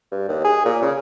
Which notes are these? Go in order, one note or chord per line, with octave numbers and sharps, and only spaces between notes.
G2
D#2
G#4
A#2
C#3